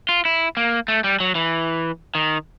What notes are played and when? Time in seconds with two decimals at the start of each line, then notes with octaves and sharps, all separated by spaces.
0.09 F4
0.25 E4
0.57 A#3
0.88 A3
1.04 G3
1.20 F#3
1.35 E3
2.15 D#3